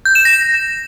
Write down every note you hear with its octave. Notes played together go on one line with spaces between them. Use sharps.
G6
E7
A#6